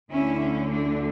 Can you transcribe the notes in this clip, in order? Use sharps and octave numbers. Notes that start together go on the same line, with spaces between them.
D2 D3 A3 C#4 E4
C#4
D4